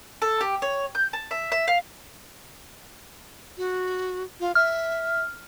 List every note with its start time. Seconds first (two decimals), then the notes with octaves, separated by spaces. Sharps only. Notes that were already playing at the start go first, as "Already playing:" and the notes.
0.22 A4
0.41 G4
0.62 C#5
0.95 G6
1.13 A5
1.31 E5
1.52 E5
1.68 F5
3.57 F#4
4.40 F4
4.55 E5 F6